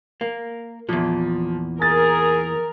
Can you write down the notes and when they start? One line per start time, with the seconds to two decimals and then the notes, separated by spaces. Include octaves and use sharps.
0.21 A#3
0.89 E2 A#2 F3
1.82 G#4 A#4 A6